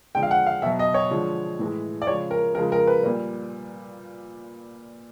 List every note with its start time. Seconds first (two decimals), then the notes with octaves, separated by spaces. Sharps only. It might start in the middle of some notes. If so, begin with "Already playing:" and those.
0.15 D3 F3 G#3 G5
0.23 F5
0.31 F#5
0.46 F5
0.62 B2 F#3 E5
0.79 D#5
0.94 C#5
1.10 D3 F3 G#3
1.59 A2 E3 G#3
2.02 D5
2.07 C#3 F3 G#3 C#5
2.31 A#4
2.55 C#3 F3 G#3 A#4
2.72 A#4
2.87 B4
3.03 A#2 G3